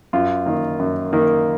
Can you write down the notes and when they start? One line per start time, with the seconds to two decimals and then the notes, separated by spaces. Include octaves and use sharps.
0.13 F#2 F4
0.46 D#3 A#3
0.79 F#2
1.13 D#3 A#3